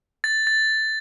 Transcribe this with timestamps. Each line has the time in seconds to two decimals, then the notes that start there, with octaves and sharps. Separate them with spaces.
0.24 A6
0.47 A6